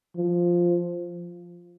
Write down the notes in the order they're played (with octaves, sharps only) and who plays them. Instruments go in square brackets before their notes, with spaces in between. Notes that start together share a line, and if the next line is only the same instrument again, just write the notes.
[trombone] F3